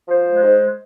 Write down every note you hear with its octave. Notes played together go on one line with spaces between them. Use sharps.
F3 C5
G#3
G#2